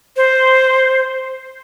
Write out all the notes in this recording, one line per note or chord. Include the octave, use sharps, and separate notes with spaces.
C5